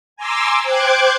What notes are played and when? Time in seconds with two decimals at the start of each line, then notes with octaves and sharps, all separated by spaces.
0.16 G#5 A#5 C6 D6 E6
0.63 C5 G5 D6 F#6 G#6